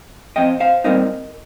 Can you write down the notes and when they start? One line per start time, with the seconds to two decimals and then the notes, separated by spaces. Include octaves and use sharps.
0.36 F2 F3 C4 D#5 G5
0.60 C5 F5
0.84 A#2 G3 C4 D#4 A#4 D#5